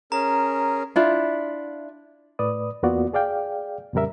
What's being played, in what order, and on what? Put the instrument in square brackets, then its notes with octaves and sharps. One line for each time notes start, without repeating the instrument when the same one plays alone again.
[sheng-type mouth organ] C#4 G#4 A#4 [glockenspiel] A#5
[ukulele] D4 E4 F4
[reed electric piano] A2 B4 D5 D#6
E2 A#3 B3 F4 F#4 D5
G#4 D5 F5 G5
F2 A#2 C#3 G3 A#4 E5